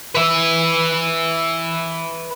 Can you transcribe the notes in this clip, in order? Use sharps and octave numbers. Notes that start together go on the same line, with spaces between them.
B4 E5